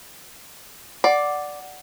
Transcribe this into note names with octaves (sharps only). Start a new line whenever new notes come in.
D5 F#5